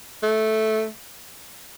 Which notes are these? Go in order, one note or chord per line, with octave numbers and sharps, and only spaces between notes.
A3